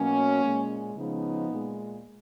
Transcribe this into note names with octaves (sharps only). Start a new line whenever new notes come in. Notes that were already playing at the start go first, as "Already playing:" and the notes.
Already playing: B2 F#3 A#3 C#4
A#2 G#3
C#3 F3 G#3 B3 D#4
A#2 G#3